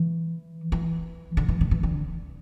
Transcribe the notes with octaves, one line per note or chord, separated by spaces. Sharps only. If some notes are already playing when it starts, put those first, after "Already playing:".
Already playing: E3
E3
D3
E3
D3
E3
D3